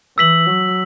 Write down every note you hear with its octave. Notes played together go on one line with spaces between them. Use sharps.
E3 E6 B6 F#7
F#3